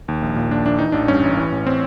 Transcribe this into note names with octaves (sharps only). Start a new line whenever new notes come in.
D#2
A#1
A#2
A#2 D4
A#1 D4
E3 D#4
A1 D4
G2 C#4
A1
E3
A1
C4